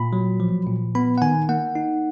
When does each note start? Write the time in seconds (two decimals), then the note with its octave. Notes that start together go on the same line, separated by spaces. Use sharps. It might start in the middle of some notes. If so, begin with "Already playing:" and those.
Already playing: A#2 B5
0.13 F#3
0.40 F3
0.67 A#2
0.95 B3 B5
1.18 F#5
1.22 D#3 G#5
1.49 A#3 F#5
1.75 D#4